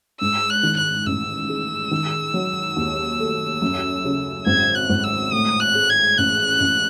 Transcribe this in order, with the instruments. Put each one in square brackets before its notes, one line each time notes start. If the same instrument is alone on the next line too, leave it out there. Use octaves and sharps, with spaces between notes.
[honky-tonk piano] G#2 [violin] E6
[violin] F#6
[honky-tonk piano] D#3
[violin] F#6
[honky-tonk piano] A1 [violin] E6
[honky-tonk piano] G#3
D#3
F#3
D#2
A3
F#2
C#3
[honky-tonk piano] G#1 [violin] G#6
[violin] F#6
[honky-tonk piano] G#1
[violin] E6
[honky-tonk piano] A2 [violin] D#6
[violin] F#6
[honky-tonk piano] G#3
[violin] G#6
[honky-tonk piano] A1 [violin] F#6
[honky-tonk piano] A1